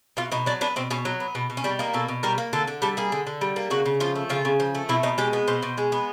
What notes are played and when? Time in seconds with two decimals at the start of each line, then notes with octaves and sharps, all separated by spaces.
0.17 B2 F4
0.32 B2 D#4
0.46 F#3 D4
0.61 B3 D4
0.76 B2 C4
0.91 B2 C#4
1.05 F#3
1.20 B3
1.35 B2
1.50 B2
1.57 C#4
1.64 G3 D4
1.79 A#3 D#4
1.94 B2 A4
2.08 B2
2.23 G3 A#4
2.38 A#3
2.53 D3 A4
2.68 D3
2.82 G3 A4
2.97 A#3 G#4
3.12 D3
3.27 D3
3.41 G3
3.56 A#3
3.70 C#3 F#4
3.85 C#3
4.00 F3 F4
4.15 A3
4.29 C#3 F4
4.45 C#3
4.60 F3
4.75 A3
4.89 B2 E4
5.03 B2 D#4
5.18 G#3 G4
5.33 B3
5.48 B2 C5
5.62 B2
5.78 G#3
5.92 B3